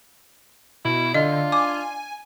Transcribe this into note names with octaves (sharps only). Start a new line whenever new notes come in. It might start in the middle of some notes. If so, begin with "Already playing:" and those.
B2 E4
D3 D4 F4 D#5
G#5 D6